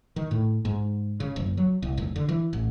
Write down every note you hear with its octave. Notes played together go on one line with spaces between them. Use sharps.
D#3
A2
G#2
C#3
F#1
F#3
C2
F1
D3
E3
A1